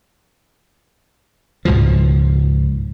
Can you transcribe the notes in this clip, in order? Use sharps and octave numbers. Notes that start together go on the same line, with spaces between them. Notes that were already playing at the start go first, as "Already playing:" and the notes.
C#2 G#2 B2 F3